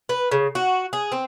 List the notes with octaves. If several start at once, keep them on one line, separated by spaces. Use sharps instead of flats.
B4
C#3
F#4
G#4
C4